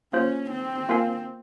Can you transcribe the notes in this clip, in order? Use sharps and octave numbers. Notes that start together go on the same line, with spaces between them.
A#3 C#4 F4 C5
C4
A#3 F4 A#4 F5 G#5